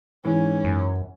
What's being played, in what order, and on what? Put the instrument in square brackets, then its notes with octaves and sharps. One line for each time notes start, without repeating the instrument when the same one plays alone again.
[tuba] G#2 [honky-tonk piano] E3 [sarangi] C#4
[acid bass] F#2